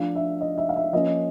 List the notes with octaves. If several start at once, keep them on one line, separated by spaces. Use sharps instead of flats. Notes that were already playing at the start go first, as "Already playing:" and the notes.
Already playing: F3 A3 D4 F5
E5
D#5
E5
F5
E5
F3 A#3 C#4 D#5